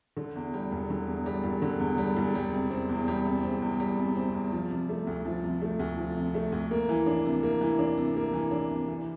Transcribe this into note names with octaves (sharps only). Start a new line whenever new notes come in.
D3
E2
G3
E1
D3
E2
G3
E1
D3
E2
G3
E1
G3
C3
C4
E2
G3
C3
C4
E2
G3
C3
C4
E2
F3
C3
A3
D2
F3
C3
A3
D2
F3
C3
A3
D2
A#3
E3
D4
C3
A#3
E3
D4
C3
A#3
E3
D4
C3
E3